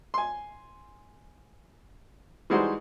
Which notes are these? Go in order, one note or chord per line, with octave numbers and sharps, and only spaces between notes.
G#5 C6
E3 G3 G#3 D#4 F#4 C5